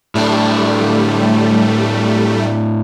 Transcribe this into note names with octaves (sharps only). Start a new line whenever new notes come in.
A2 G3 A3 D4